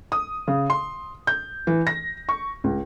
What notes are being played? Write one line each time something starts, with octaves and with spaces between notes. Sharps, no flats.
D#6
C#3
C6
G6
E3
A#6
C#6
C#2